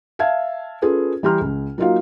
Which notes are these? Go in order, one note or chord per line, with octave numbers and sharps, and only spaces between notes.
E5 F5 A5 G#6
C#4 F4 G#4 A4 B4
E3 G3 G4 A#5 C6 F6
C#2
F#3 A#3 D#4 F4 F#4 F5